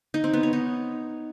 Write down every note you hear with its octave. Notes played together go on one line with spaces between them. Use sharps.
D#4
C4
B3
C#5
D#4